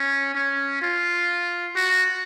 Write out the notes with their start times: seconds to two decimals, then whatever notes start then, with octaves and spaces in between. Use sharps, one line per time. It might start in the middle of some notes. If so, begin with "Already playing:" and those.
Already playing: C#4
0.35 C#4
0.82 F4
1.76 F#4